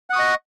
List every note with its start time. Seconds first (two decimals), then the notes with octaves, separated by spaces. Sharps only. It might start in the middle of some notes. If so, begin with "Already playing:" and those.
0.10 F#5
0.13 D#6
0.16 C#6
0.19 D#5